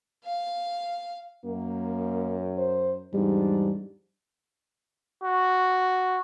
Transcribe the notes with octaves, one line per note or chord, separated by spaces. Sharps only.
F5
F#2 A#3
C5
E2 G#2 G3 D4
F#4